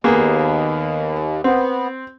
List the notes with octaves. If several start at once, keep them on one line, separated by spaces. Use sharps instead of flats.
D#2 A#3 B3 G#4
B3 C4